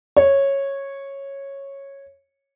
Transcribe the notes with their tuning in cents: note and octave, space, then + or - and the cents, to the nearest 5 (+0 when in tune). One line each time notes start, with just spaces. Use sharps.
C#5 -10